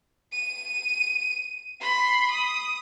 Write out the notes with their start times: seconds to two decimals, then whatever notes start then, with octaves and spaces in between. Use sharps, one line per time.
0.32 D#7
1.81 B5 C6
2.31 D#6